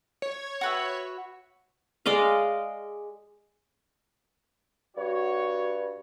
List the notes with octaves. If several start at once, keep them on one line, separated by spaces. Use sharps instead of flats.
C#5
F#4 B4 E5
G#3 D5 D#5 F5
G2 F#4 C#5